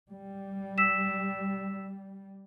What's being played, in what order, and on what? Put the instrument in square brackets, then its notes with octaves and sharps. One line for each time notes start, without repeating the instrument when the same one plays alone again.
[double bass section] G3
[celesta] E6 B6 E7